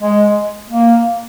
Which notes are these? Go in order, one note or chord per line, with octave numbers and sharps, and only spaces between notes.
G#3
A#3